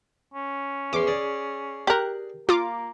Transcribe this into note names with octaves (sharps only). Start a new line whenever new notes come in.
C#4
E2 C6 D6
G#4 D5
G4 A#4 F#6
A#3 F4 D6